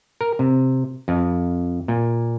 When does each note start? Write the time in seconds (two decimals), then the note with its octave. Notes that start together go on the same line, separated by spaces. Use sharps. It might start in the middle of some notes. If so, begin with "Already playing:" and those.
0.21 A#4
0.39 C3
1.08 F2
1.88 A#2